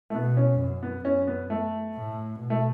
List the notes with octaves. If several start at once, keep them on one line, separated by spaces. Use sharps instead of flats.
A3
B2 B3
C#4
F#2
B3
F#2 C#4
B3
A3
A2
B2
A3